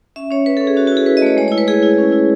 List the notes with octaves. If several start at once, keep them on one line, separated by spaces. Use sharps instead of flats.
C#4 E5
C#4 C#5
C#4 B4
A4
C#4
G#4
C#4 F#4
F#4
E4 G#4
E4 B4
D#5
A3 C#5
G#3 C#5
E4 C#5
B4
E4 G#4
E4
C#4
E4